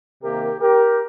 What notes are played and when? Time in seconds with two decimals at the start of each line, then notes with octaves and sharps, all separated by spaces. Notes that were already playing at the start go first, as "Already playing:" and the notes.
0.23 C3 D#3 A#3 G4 A#4
0.61 G4 A#4